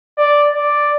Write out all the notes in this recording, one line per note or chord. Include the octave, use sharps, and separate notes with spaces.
D5
D5